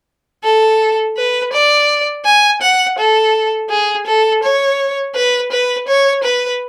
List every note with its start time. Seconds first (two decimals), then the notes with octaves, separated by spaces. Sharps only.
0.44 A4
1.17 B4
1.53 D5
2.25 G#5
2.62 F#5
2.98 A4
3.70 G#4
4.07 A4
4.43 C#5
5.15 B4
5.52 B4
5.88 C#5
6.23 B4